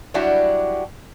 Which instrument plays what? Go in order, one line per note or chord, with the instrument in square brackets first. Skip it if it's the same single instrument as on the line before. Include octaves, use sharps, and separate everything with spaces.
[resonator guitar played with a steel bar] F#3 G3 D4 E4 F#4 G4